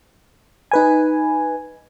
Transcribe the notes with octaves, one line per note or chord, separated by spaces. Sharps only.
D#4 B4 G#5